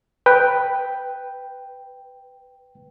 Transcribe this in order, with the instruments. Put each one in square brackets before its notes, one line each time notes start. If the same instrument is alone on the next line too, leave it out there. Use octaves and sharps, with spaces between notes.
[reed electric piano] B4 G5